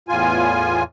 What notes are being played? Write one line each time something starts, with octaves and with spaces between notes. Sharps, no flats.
E2 A2 F4 G#5